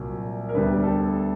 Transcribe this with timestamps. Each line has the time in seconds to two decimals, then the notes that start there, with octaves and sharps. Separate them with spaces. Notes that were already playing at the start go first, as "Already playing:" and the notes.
Already playing: C2 A#2 F#3
0.49 A#4
0.55 D2 D3 G3 B3 B4
0.83 A4